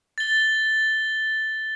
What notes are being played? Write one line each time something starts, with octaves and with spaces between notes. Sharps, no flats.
A6 G7